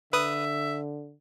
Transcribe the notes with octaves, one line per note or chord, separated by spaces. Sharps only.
D3 B4 E5 D#6